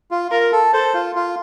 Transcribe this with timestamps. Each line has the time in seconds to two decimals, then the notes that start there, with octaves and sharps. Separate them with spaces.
0.11 F4
0.31 F4 A#4
0.52 A4
0.73 A4 C5
0.94 F4
1.16 F4